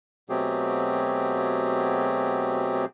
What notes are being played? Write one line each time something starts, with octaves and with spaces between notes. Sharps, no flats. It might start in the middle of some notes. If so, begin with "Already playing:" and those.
B2 F#3 A3 C4 G4 G#4